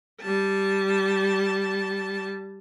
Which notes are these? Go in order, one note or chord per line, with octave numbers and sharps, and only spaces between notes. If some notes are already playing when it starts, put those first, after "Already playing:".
G3 A5